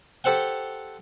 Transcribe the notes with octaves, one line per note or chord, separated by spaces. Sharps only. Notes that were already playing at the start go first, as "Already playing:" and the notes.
G4 A4 C5 F#5 G5